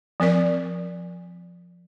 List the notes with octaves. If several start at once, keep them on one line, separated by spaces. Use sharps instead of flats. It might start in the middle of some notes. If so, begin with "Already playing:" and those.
F3 C4 A#4 D5